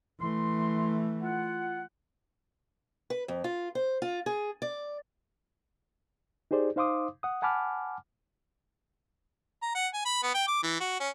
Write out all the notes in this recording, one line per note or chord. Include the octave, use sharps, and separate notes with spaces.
E3 A3 C6
F4 F#5
B4
F2
F4
C5
F4
G#4
D5
D#4 G4 G#4 C5 D5
D#4 C5 F5 C6 D6 D#6
F#5 D#6
F#5 G#5 A5 B5 D6 F6
A#5
F#5
G#5
B5
B3
G5
D6
E3
F#4
C#4